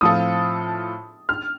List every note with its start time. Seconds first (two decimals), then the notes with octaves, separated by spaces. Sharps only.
0.01 A2 F3 C4 F4 A4 D#6
1.29 F6